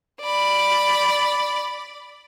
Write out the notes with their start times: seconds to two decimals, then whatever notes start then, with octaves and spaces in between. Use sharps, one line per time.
0.22 D5 B5